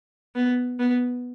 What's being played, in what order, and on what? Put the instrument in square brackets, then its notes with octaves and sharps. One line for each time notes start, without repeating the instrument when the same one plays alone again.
[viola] B3
B3